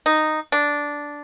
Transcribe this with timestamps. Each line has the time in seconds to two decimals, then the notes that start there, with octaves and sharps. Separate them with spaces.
0.06 D#4
0.52 D4